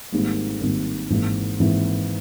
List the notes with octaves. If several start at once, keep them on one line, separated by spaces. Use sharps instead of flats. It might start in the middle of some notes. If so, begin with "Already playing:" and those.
G#1 G#2 D#3 G3 A#3
G#1 G#2 D#3 G3 A#3
G#1 G#2 E3 A#3 E4
G#1 G#2 E3 A#3 E4